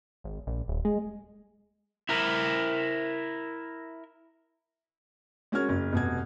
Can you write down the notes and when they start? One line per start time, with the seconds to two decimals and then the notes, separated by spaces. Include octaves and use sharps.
0.24 G#1
0.47 A#1
0.68 D#1
0.85 G#3
2.09 E4 A#4
5.52 G#3 C#4 F#4 A#4 F6 G#6
5.69 F#1
5.93 F1 B2 G#6